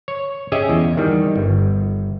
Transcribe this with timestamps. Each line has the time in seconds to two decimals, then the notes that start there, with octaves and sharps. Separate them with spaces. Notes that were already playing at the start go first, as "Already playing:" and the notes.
0.08 C#5
0.52 C#4 G4 G#4 D#5 E5
0.70 E2
0.97 D#3 G3
1.36 G1